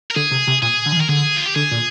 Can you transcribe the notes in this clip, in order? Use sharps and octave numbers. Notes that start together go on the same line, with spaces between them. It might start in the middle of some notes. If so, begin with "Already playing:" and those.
A#4
D3 G#4
C3
C3
A#2 G#4
D3
F3
D#3
A#4
D3 G#4
F4
G4
D3 G#4
A#2